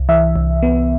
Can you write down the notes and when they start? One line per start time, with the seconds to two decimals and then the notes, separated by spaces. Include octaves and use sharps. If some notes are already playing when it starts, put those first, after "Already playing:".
Already playing: C2
0.09 E3 E5
0.36 C2
0.63 B3